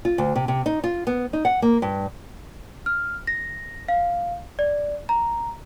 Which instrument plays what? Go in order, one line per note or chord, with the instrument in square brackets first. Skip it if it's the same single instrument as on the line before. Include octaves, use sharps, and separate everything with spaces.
[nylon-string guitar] F4
D2
C3
C3
D#4
F4
B3
D#4
F#5
A#3
G2
[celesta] F6
A#6
F5
D5
A#5